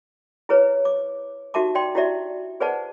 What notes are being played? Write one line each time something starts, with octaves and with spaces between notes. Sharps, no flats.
E4 G#4 B4 C#5
D6
D#4 F#4 G4 E5 A5 D6
D5 G5 C6
E4 F#4 G4 D5 E5
G#4 B4 C5 D5 F#5 A5